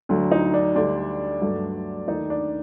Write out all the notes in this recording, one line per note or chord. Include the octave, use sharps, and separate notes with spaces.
D2 D3 F#3
D#4
D4
D2 D3 G3 D4
G2 F#3 A3
D#2 D#3 A3 D#4
D4